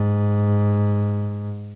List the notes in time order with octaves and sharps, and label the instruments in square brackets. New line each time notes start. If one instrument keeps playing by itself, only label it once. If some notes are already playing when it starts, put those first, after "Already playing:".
Already playing: [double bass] G#2